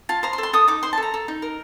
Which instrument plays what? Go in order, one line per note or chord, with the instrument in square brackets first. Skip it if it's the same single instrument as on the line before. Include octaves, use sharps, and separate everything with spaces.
[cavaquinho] F4 A5
C5 A#5
C6
A4
C6
A4 D#6
D#4 D6
C5 C6
A5
A4 A#5
A4
D#4
A#4